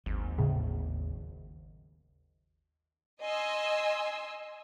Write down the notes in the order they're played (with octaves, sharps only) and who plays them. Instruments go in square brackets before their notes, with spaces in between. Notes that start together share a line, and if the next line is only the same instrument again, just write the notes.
[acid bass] G#1 [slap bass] D#2 F#3
[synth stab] A2 C#3
[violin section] D#5 G#5 C6 E6